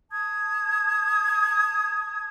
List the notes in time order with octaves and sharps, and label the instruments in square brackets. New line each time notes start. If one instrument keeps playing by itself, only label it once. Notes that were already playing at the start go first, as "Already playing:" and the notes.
[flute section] A5 D#6 G#6